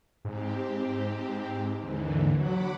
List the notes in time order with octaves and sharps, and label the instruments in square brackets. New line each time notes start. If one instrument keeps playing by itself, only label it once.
[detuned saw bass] G#2 [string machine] C4 G4
[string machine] D#2 D3 E3
[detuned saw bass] F#3 [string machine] F#5 B5 D6